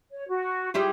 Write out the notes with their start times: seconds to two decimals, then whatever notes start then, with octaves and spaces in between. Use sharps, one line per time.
0.12 C#5
0.27 F#4
0.74 G3 E4 F4 G#4